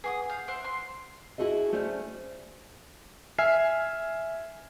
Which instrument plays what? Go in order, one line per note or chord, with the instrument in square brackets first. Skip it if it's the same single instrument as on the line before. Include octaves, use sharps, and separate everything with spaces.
[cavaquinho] G#4 C#6 D#6 [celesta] B4 F#5 G#5
[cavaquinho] F5 [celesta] G6
[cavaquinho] C5 E5 F#5 [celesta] D7
[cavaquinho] C6
[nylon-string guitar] E4 F#4 G#4 A4 D#5
A3 C#4 C5 D5
[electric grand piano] E5 G#5 F6 C7